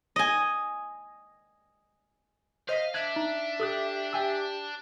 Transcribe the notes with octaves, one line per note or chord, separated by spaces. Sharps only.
D#5 G#5
C5 D#5 F5 B6
D4 E5 F#6 G#6
D#4
G4 A4 D#6 F#6
G4 G5 G#5 E6